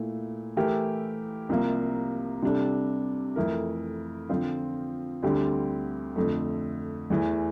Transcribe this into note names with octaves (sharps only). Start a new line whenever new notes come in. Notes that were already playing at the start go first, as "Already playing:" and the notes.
Already playing: A#2 A3 E4
E3 A3 E4 G4 A#4
C2 C3 F3 A#3
C3 G3 D4 A4
F2 E3 A3 E4 A#4
D3 F3 C4 F4
D2 D3 G3 C4 G4
F2 D3 A3
E2 E3 A3